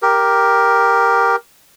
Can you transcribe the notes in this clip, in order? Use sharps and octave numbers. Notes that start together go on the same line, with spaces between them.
G4 A#4